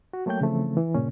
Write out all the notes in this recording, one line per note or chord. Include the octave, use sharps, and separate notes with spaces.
F#4
F#3 A3 A#3 C#5 G5 G6
C#3 E3 F3 A3 C4
E3
G2 A#2 C#3 A#3 C#4